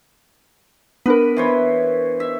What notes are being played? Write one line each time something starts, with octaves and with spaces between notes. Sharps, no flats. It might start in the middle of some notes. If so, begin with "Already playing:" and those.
B3 D4 A#4 B4
E3 C5 C#5
E5